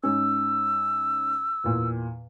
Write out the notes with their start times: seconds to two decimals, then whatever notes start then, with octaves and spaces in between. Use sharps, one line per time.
0.03 G#2 C#4 E6
1.64 E2 A#2